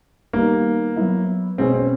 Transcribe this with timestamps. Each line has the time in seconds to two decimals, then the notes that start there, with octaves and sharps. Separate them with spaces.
0.33 D#3 G3 A#3 B3 D#4
0.96 F#3 B3 E4
1.58 B2 G#3 C4 C#4
1.74 C4